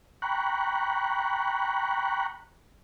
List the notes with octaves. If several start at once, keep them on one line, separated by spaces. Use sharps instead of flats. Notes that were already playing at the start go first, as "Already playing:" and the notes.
G5 A#5 B5 C#6 F#6